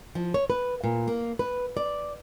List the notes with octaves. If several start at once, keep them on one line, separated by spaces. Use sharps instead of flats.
F3
C#5
B4
A#2
A#3
B4
D5